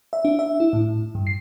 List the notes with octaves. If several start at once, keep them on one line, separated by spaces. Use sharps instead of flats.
E5
D4
E5
E4
A2
G2
C7